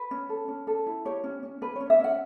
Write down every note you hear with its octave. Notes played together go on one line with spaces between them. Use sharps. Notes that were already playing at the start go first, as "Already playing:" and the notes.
Already playing: B4
C#4
A4
C#4
A4
E4
G4 C#5
C#4
C#4
C#4 B4
C#4 C#5
E5
C#4 F#5